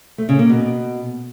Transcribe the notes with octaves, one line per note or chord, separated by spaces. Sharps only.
A3
C#3
A#3
B2